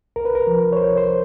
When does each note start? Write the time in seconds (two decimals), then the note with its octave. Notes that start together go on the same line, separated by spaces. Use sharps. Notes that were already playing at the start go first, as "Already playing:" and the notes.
0.16 C2 A#4
0.25 B4
0.35 A#4
0.47 F3
0.72 C#5
0.77 C2 C5
0.98 C5